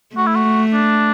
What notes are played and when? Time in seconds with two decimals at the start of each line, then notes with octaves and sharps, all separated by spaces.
0.16 A3 F#4
0.26 E4
0.35 F#4
0.73 D4